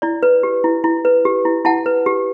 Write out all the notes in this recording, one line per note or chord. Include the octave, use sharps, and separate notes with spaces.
E4 D5
B4
G4
E4
E4
B4
G4
E4
E4 F#5 A5
B4
G4